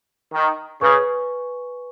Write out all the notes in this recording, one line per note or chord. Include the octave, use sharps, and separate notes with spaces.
D#3
C#3 B4 G#5 C#6